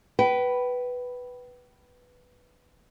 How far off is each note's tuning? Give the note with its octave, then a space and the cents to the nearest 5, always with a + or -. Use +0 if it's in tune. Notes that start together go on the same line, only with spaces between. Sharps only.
B4 +0 G5 -35